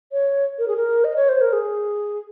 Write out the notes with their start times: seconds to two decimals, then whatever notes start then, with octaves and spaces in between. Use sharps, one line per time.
0.12 C#5
0.59 A#4
0.68 G#4
0.77 A#4
1.04 D#5
1.16 C#5
1.29 C5
1.41 A#4
1.53 G#4